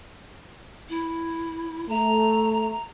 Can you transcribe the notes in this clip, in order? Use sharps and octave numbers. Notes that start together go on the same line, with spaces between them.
E4
A3 A#5